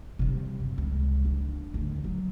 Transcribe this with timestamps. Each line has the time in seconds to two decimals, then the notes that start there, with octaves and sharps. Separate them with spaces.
0.19 C3 G3
0.60 F#2
0.78 C#2
1.25 D4
1.74 D2
2.04 F#3